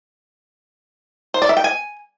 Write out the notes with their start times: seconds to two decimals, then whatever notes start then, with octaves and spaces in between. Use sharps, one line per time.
1.34 C5
1.42 D5
1.49 E5
1.57 G5
1.64 G#5